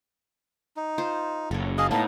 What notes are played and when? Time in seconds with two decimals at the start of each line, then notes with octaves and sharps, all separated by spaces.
0.76 D#4
0.98 F4 C5
1.51 F#1 A4 C#5
1.78 A#3 G#4 D#5 F5 A5 D#6
1.91 A2 A#3 B3 D#4 F5 A5